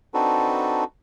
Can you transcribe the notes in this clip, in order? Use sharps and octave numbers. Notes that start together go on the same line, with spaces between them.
C4 D4 D#4 F#4 A4 B4